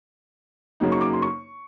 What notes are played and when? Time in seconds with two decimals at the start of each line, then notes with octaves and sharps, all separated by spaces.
0.80 F#2 C#3 F#3 A#3 D#4
0.92 C#6
1.01 D6
1.13 C6
1.22 C#6